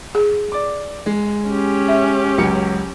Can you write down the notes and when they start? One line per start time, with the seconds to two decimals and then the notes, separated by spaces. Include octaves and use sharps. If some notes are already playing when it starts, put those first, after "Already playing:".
0.15 G#4
0.52 D5 D6
1.06 G#3
1.47 C#4 G4
1.88 E5
2.38 C#2 F#3 C#7